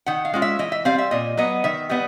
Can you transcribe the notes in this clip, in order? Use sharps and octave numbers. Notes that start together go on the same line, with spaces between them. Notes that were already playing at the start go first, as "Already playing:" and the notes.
D#3 F#5
F5
G#3 C#4 F4
E5
E3 D#5
E5
G3 C4 F5
E5
A#2 D#5
F#3 B3 D#5
D#3 E5
G3 B3 D#5